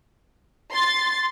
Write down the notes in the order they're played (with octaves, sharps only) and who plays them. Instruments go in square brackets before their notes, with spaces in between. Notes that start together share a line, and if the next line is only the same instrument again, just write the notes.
[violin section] C6 A6